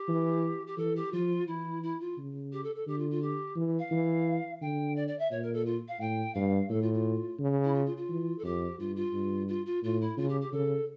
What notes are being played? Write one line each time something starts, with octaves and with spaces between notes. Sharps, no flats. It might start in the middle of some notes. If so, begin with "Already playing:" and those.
Already playing: G4
E3
G4
E3 A4
G4
F3 F4
E3 E4
E4
F4
C#3
G4
A4
A4
D3 G4
F4
F4
G4
E3
F5
E3
D3 G5
D5
D5
E5
A#2 C#5
A#4
A4
F4
F5
A2 G5
G2 F5
A2 A4
F4
F4
C#3
E4
F4
F4
F4
E3
A4
F2 G4
G2 F4
F4
G2
F4
F4
A2 F4
E4
C#3 F4
G4
G4
C#3 A4